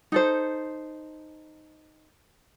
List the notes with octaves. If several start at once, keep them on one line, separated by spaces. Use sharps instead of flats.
D#4 A4 C5